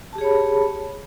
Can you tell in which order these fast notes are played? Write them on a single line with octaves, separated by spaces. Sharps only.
A5 G4 G#4 C#5 B5